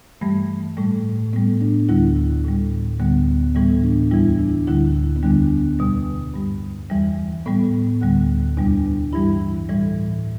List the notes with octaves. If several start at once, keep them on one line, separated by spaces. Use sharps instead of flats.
G2 E3 G3 A3
A2 G3 A3
A2 G3 B3
D4
D2 D3 G3 E4
A2 G3
D2 D3 G3 B3
A2 E3 G3 B3
D4
E2 E3 G3 E4
D4
D2 D3 G3 E4
B3
E2 D3 G3 D4
E2 B2 G3
G2 G3
E2 E3 G3
A2 G3 B3
D2 D3 G3
E2 B2 G3 D4
G2 E3 G3 E4
A2 E3 G3